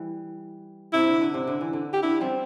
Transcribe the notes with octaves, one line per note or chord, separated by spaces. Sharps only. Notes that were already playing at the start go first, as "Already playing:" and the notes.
Already playing: E3 G3
C3 E4
D3
D3
C3
D3
E3
D3
G4
D3 E4
G3 C4